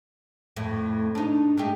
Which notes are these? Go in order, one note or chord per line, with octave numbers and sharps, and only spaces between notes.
F2 A2
D4 D#4
G#3 A3 G4